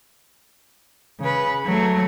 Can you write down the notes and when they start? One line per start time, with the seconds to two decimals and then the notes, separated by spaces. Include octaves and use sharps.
1.20 C#3 B4
1.65 F#3 A3